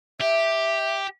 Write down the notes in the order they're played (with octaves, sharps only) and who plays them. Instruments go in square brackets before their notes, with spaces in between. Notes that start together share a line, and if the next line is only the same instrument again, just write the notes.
[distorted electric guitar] G4 [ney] E5